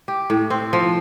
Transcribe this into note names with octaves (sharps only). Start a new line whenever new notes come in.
G4
A2
C4
F3